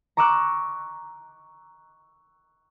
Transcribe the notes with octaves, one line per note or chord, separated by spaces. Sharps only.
A#5 C#6 D6 E6 F#6